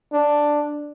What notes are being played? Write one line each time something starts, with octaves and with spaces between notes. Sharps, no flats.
D4